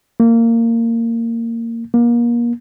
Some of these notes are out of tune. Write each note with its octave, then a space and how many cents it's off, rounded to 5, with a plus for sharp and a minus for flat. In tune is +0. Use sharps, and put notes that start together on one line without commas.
A#3 -20
A#3 +30